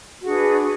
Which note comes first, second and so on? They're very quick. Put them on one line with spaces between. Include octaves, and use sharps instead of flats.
F#4 G#4 D4 B4